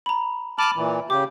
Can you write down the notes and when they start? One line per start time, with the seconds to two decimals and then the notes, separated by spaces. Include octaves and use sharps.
0.06 A#5 B5
0.59 A5 B5 D6 F6 D#7 F#7
0.76 A#2 E3
1.10 C#3 G4 D6